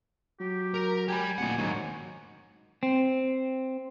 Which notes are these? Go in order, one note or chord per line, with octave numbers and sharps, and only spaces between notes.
F#3 G4
A#4
G4 G#5 B5
D1 A#2 F#5
G#2 D#3 F#3
C4